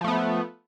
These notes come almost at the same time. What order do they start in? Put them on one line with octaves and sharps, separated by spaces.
F3 A3 B3